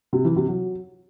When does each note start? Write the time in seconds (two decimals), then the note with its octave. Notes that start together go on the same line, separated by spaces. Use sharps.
0.13 C3
0.24 E3
0.36 C3
0.48 F#3